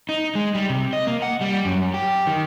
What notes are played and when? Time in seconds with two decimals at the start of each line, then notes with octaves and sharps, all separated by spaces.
0.09 D#4
0.35 G#3
0.55 G3
0.70 C3
0.93 D#5
1.07 A#3
1.22 F#5
1.41 G3
1.65 F#2
1.94 G4
2.27 D#3